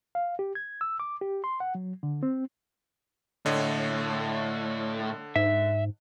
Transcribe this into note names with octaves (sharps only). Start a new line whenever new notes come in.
F5
G4
G#6
E6
D6
G4
C6
F#5
F#3
D3
C4
A2 D3 C#5 D#5
G#2 E5